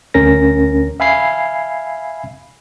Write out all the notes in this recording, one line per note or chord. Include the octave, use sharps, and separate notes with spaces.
D2 C#4 A#4 A#6
E5 F5 G#5 B5 G#6 C7